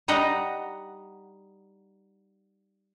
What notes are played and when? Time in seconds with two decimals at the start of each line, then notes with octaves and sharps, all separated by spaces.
0.08 G3 D#4 D#5 F#5 A#5